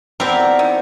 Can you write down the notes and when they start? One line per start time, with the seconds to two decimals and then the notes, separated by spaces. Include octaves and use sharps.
0.20 B2 F3 C4 E4 G4 A#4 D5 A5
0.59 D#3